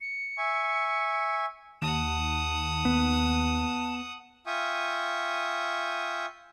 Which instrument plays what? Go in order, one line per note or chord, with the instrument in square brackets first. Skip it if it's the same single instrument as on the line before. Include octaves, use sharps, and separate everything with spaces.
[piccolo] C#7
[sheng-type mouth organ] E5 G#5 C#6
[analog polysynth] D#2 [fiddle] F#5 D#6 [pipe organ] A5
[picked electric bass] B3
[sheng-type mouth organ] F4 E5 G5 G#5 C#6 D#6